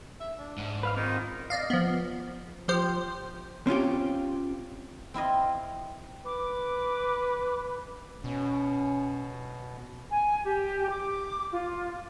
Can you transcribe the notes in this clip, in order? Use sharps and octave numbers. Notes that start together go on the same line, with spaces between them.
E5
D4
G#2
B4 F5 F6
D#3 C4 F4
D5 D#5 F5
F3 B3
F3 G4 C5
C4 C#4 F4 G4
C4 E4 F4 D#5
B4 D6
B2 C#4
G#5
G4
D6
F4